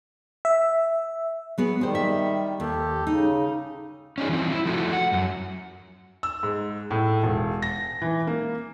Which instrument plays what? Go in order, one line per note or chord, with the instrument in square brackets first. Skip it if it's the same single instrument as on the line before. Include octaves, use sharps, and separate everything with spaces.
[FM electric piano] E5
[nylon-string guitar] F#3 B3 G#4
[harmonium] D#3 G3 [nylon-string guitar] G#4 C5
[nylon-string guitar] E5
[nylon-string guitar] D#2 [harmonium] G4 A4
[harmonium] C#3 [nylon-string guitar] D#4
[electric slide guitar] C#4 D#4 G#4
E3 F3 C4
E4
F3 A3 E4 F#4
F#5
F#2
[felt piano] E6
G#2
A2
E1
A#6
E3
A#3